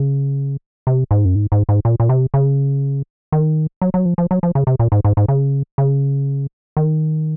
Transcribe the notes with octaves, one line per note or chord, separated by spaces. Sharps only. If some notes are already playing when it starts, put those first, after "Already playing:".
Already playing: C#3
C3
G#2
F#2
G#2
G#2
G#2
A#2
A#2
C3
C#3
D#3
F#3
F#3
F3
F3
F#3
F3
C#3
C3
A#2
G#2
G#2
G#2
C#3
C#3
D#3